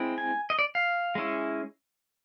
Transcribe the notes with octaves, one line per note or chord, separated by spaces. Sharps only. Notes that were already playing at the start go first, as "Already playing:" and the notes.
Already playing: G#3 C4 E4
G#5
D#5
D5
F5
G#3 C#4 E4